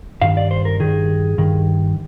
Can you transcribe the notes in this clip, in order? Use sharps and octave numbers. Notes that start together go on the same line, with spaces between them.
G2 D#3 F5
D5
C5
A#4
G2 D#3 G#4
G2 D#3